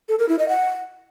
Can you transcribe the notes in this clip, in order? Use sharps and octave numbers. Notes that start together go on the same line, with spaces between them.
A4
A#4
E4
D#5
F#5